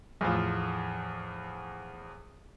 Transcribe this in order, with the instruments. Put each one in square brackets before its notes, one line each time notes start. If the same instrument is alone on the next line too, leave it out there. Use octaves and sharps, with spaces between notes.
[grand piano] E2 A2 F3